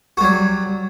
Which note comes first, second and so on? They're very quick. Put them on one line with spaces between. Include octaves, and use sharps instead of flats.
F#4 G3 F#3